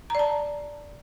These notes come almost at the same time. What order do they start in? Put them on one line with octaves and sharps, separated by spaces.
A#5 D5 A5